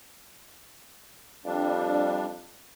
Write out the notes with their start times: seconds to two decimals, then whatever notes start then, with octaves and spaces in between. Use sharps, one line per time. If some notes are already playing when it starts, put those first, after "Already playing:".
1.45 F2 G3 D4